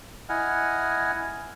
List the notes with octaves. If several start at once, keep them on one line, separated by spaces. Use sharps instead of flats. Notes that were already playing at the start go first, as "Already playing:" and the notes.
E4 D#5 F#5 G#5 F6